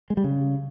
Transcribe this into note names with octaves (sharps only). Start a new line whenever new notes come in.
G#3
G3
C#3